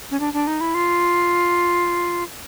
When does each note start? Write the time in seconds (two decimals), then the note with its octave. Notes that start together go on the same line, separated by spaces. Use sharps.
0.11 C#4
0.20 D4
0.33 D4
0.47 D#4
0.61 E4
0.74 F4